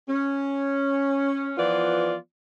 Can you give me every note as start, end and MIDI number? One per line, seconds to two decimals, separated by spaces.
0.09 1.52 61
1.58 2.15 52
1.58 2.15 53
1.58 2.15 59
1.58 2.15 65
1.58 2.15 74